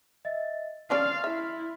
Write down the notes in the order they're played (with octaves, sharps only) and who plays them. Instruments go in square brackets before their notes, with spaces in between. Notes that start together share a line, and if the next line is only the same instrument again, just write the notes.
[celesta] D#5 E5 A6
[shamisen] F3 C#4 D5 [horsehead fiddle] F5 [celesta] C6 F6 A6
[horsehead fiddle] E4 [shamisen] E5